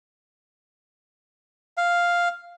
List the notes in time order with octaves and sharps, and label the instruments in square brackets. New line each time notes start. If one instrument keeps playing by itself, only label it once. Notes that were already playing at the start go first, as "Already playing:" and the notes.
[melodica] F5